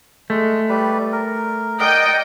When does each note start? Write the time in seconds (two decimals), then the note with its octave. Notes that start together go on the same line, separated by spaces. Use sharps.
0.30 G#3 A3
0.69 G3 B4
1.12 A#4
1.80 A#4 D5 D#5 F#5 G5